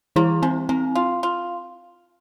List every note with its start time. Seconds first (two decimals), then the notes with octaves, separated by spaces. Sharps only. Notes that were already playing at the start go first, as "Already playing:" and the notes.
0.16 E3 A#3 E4
0.42 C3 C4
0.69 A#3 C4
0.95 F4
1.23 F4